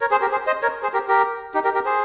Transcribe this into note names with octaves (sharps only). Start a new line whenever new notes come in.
A#4 C#5
G#4 C5
G4 A#4
G#4 C5
C5 D#5
A#4 C#5
G#4 C5
G4 A#4
G4 A#4
D#4 G4
G4 A#4
G4 A#4
G#4 C5